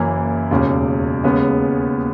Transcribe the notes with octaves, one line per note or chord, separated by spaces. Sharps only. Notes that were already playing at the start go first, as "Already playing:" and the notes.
Already playing: F#1 F#2 E3 A#3 E4
E1 D#2 C#3
D#2 C#3 G#3 B3